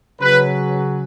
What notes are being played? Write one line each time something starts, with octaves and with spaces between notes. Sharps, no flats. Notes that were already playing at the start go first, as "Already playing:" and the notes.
C#3 F#3 C#4 B4